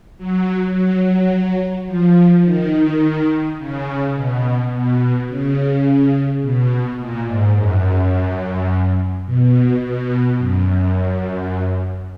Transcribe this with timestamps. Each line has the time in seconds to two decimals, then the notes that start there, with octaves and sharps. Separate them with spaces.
0.18 F#3
0.73 F#3
1.87 F3
2.44 D#3
3.58 C#3
4.15 B2
4.72 B2
5.29 C#3
6.42 B2
6.99 A#2
7.26 G#2
7.56 F#2
9.26 B2
9.82 B2
10.38 F#2